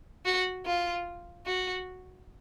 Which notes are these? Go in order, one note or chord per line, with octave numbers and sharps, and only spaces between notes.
F#4
F4
F#4